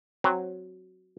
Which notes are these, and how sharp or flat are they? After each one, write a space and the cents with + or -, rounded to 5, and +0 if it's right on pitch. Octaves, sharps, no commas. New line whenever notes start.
F#3 +0 C4 +15